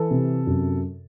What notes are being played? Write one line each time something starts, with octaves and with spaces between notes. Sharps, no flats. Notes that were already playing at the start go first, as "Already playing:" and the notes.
Already playing: E3 A4
C3
F#2